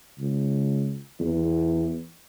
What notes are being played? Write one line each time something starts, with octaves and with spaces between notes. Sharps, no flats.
C#2
E2